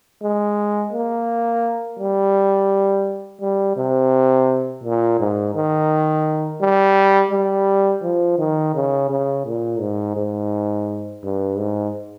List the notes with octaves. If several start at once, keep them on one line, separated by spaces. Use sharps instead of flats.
G#3
A#3
G3
G3
C3
A#2
G#2
D#3
G3
G3
F3
D#3
C#3
C#3
A#2
G#2
G#2
G2
G#2